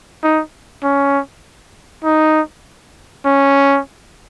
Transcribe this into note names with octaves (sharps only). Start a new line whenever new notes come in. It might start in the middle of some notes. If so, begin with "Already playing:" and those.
D#4
C#4
D#4
C#4